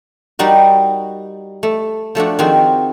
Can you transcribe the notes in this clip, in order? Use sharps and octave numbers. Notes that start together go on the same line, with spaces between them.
G3 D#4 F#4 A#4
A3
F3 A3 D4 F#4
D#3 F3 C4 F#4 G#4